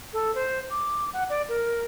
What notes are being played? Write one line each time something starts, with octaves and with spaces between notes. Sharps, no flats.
A4
C5
D6
F#5
D5
A#4